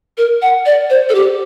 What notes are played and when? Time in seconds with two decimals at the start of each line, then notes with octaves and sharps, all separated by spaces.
0.18 A#4
0.42 F#5
0.66 D5
0.90 C5
1.09 A4
1.15 G4